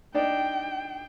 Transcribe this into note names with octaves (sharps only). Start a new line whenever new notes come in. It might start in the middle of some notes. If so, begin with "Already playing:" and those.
D4 D#4 D5 G5